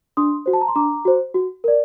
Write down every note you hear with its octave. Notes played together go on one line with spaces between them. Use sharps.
D4 C6 D#6
F#4 C5
A5
A#5
C6
D4 A#5 D6
F#4 C5
F#4
A#4 D5